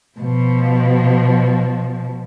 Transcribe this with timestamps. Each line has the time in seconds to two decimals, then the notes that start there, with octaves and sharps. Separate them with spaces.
0.18 B2 F3